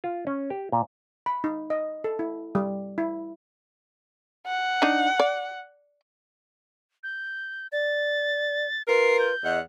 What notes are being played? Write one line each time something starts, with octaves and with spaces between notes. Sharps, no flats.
F4
C#4
G4
A#2
B5
D#4
D#5
A4
E4
G3
E4
F#5
D4 D#4
D5
G6
D5 A6
F4 A#4 B4 C7
G6
E2 D#5 F#5